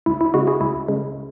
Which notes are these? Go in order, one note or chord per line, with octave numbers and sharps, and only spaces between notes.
C#2 E4
E4
C#3 G#3 F#4
E4 G#4
C#2 E4
C#3 G#3